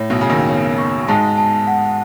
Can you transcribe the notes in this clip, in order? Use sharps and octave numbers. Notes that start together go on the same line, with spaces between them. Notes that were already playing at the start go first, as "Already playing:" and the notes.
Already playing: A2 C#5
B1 B2
C#3 G#5
D#2 D#3
C#5
C#6
G#2 G#3 A5
A5
F#5